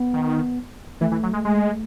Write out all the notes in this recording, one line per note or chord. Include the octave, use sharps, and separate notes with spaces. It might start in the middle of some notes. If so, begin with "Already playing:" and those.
Already playing: B3
D#3
E3 A3
E3
F#3
G#3
G#3